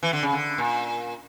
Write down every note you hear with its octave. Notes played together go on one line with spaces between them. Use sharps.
E3
D3
C#3
D3
A#2